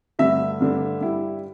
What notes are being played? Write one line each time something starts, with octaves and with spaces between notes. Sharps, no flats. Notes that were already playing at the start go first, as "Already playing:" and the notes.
G2 D3 A3 E5
G2 D3 A3 D4
G2 G3 E4